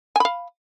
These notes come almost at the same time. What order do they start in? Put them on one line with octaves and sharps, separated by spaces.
G#5 B5 F5